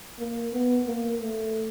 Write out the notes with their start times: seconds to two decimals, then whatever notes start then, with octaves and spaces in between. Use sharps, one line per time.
0.19 A#3
0.53 B3
0.87 A#3
1.21 A3